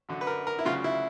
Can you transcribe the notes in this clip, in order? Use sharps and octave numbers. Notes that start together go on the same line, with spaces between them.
F#2 D3 F#3
B4
A#4
A#4
E4
D2 C#3 F#3 F4
E4